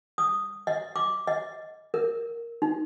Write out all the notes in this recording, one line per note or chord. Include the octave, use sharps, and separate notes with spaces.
D#6
D#5
D6
D#5
A#4
D#4